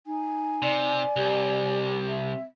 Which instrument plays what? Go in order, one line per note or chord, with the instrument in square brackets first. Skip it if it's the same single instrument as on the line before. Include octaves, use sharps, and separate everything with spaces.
[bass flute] D#4 [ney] G#5
[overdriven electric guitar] C3 [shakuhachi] D5
[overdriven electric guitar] C2 [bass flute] G4
[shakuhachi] C4 [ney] E5